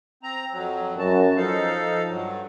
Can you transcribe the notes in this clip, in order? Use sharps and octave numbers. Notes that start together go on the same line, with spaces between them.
C4 A#5
F2 F#3
F#2 F#4 A5
F3 D#4 A4 F5
G2 F#3